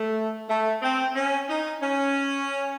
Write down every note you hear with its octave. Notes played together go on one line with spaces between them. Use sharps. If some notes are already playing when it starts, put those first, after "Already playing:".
Already playing: A3
A3
C4
C#4
D#4
C#4